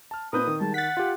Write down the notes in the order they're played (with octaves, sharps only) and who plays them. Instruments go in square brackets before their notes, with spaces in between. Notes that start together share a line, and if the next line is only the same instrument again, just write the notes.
[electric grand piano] A5 F6
[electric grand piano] A#2 B4 G6 [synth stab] C4 D#4 A#4 [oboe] D#6
[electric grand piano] D#3
[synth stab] G3 G#3 [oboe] A5
[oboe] F#5 [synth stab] A6 B6
[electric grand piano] F4 G4